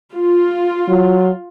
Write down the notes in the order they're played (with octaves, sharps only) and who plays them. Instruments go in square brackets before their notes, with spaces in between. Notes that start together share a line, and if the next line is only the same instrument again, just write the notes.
[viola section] F4
[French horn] F#3